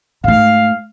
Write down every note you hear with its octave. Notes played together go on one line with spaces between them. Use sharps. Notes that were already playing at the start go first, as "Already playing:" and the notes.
G#2 A3 F5